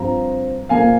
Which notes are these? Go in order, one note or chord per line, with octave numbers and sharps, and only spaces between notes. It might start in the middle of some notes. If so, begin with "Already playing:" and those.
Already playing: G2 F3 C4 F4 A#5
A#2 F3 A#3 F5 G#5